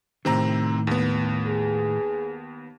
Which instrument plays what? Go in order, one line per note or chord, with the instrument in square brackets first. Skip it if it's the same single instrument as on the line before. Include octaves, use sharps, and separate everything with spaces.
[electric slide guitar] A2 D#3 [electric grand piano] C3 C4 A#5
[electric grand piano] D#2 B3
[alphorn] G#4